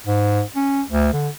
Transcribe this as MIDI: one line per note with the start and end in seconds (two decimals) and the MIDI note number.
0.07 0.42 44
0.56 0.82 61
0.90 1.13 38
1.13 1.29 50